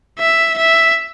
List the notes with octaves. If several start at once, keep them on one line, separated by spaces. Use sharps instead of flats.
E5
E5